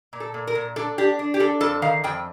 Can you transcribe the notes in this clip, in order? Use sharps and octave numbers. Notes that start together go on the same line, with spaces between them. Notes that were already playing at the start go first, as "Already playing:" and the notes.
A#2
A4
A#2
A#4
A#2
D4 A4
D4 G4
D4
G4
D4 A4
F2 A4
D#3 F5
F2 G5